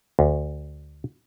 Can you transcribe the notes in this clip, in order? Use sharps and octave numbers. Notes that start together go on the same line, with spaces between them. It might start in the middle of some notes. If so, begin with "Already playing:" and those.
D2